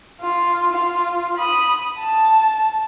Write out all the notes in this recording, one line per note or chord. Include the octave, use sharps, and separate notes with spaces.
F4
F4
B5 D#6
A5